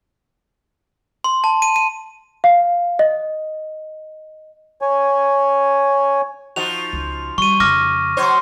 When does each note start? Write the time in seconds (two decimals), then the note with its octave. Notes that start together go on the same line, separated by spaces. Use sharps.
1.24 C6
1.44 A5
1.62 D#7
1.76 D#7
2.44 F5
2.99 D#5
4.82 C#5 G#5
6.56 F3 D#4 F#4 F7
6.93 C#2
7.38 G3 C#6 D#7
7.60 F2 C#3 D6 F6 A#6
8.17 F#3 C5 C#5